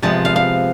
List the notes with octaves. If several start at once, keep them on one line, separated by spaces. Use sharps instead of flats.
C3 F3 G#3 B3 A5
F5
F5